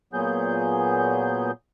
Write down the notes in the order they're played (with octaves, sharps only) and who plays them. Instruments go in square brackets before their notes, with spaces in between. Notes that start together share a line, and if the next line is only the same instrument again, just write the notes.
[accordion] A#2 F#3 B3 G#4 G6